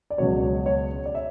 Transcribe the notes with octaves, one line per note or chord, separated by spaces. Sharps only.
D5
C#2 B2 F#3 C#5
C#5
C#5
D5
E5